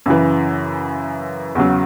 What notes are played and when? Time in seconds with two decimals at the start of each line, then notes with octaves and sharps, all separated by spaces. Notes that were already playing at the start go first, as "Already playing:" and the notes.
0.06 F#2 C#3 E3
1.55 E2 C#3 F#3